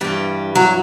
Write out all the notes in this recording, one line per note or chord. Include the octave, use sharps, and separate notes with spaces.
G2 E3 G3
F#3